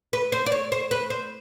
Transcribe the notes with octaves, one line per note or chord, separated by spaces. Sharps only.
B4
C5
D5
C#5
C5
B4
C5